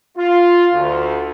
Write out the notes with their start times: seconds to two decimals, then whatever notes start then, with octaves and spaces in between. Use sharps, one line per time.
0.18 F4
0.74 D2